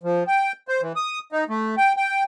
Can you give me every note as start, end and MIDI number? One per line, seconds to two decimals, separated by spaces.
0.03 0.24 53
0.27 0.52 79
0.68 0.81 72
0.81 0.93 52
0.96 1.19 87
1.32 1.44 63
1.49 1.75 57
1.77 1.93 79
1.97 2.23 79